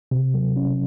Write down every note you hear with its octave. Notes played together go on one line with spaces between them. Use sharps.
C3
F#3
C#4